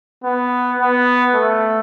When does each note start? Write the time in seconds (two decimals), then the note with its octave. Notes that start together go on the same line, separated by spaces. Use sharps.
0.24 B3
0.79 B3
1.34 A3